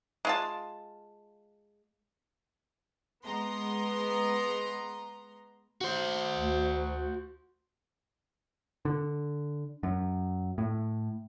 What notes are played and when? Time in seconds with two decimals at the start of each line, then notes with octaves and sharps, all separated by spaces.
0.25 G#3 F4 A5
3.24 G#3 B3 A#5 C6
5.81 F#4 C5
6.37 D2
8.85 D3
9.83 F#2
10.58 A2